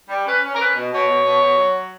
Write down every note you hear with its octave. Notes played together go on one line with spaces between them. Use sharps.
G3
C#4 B4
C#4
A#4
C#4 B4
B2
B2 C#5
B2
B2
B2
F#3